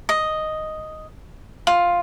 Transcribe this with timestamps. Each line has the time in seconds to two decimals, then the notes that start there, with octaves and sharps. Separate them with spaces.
0.09 D#5
1.67 F4